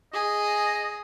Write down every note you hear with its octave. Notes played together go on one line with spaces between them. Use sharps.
G#4 D#5